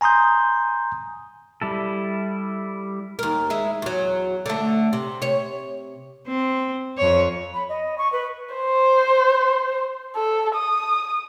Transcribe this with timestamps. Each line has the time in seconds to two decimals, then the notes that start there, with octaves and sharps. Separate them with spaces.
0.01 G#5 A#5 C6 D#6 G6
1.62 G3 E4 A4
3.19 D#2 A#4
3.50 G#3 E4
3.82 E2 F#3
4.46 D3 A3
4.93 C3
5.22 C3 C#5
6.27 C4
6.98 F2 C#5
7.54 B5
7.69 D#5
7.98 C#6
8.12 B4
8.55 C5
10.16 A4
10.55 D#6